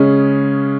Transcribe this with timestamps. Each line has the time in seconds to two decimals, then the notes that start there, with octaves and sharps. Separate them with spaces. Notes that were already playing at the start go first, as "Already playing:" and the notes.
Already playing: C#3 G#3 C#4